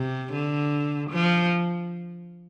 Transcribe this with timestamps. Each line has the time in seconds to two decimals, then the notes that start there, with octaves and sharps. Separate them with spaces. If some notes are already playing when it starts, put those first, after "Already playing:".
Already playing: C3
0.33 D3
1.10 F3